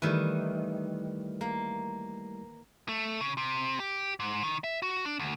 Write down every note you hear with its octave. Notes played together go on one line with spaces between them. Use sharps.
D#3 E3 G3 A3 E4
A#3
A3
C#3
C3
G4
G#2
D#3
E5
F#4
D4
D2